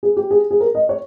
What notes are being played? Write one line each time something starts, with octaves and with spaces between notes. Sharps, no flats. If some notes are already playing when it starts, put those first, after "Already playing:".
G#4
G4
G#4
G#4
A#4
D#5
C#5